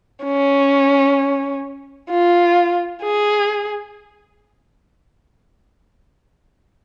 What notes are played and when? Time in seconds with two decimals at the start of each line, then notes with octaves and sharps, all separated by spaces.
0.24 C#4
2.10 F4
3.03 G#4